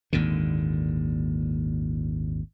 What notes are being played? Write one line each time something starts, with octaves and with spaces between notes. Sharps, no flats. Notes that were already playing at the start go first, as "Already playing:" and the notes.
G#1 D#2 A#2 D3